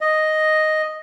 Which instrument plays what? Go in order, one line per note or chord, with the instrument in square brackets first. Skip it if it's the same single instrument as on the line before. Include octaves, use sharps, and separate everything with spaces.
[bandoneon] D#5